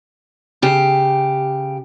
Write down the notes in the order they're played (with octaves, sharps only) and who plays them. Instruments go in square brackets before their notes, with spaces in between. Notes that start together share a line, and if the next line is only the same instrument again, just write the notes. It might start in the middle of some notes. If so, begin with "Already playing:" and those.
[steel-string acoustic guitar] C#3 G4